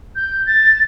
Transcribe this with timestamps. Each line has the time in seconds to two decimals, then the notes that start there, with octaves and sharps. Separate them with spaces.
0.15 G6
0.46 A6